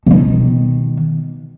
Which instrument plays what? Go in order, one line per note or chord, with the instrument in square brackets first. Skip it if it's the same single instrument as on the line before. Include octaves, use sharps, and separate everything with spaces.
[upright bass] B2 D#3